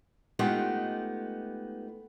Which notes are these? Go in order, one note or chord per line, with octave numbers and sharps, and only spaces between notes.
G#3 A3 B3 D#4 F4 G4